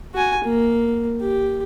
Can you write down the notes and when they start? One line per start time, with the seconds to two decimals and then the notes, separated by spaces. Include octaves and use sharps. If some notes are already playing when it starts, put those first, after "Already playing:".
0.15 F#4 G#5
0.44 A#3
1.21 G4